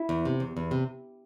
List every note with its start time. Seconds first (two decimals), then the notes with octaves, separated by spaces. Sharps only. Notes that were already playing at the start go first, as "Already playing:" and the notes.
Already playing: E4
0.09 E2
0.25 C3
0.40 E2
0.57 E2
0.71 C3